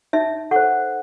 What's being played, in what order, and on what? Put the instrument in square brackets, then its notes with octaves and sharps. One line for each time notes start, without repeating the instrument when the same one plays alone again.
[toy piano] D#4 E5
A4 C5 F#5